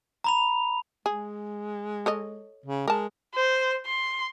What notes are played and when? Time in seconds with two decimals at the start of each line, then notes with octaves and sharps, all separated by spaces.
0.24 A#5 B5 F7
1.06 G#3 G#4
2.06 A4 C#5 D#5
2.66 C#3
2.88 G#3 A#4 A5
3.35 C5
3.86 C6